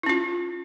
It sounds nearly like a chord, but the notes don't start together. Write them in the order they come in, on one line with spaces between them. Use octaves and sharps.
E4 C#4 F4